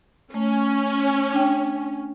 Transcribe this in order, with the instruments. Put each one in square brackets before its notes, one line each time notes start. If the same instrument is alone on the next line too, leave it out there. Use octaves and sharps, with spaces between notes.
[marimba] A3 [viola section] C#4
[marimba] D4 G5